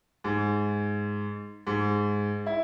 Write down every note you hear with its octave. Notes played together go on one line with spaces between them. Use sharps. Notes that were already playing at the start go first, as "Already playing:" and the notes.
G#2
G#2
E4